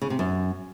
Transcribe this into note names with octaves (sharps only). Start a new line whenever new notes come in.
C#3
C3
F#2